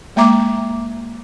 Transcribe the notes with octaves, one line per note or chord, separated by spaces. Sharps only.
G#3 A#3 E5 A#5 D6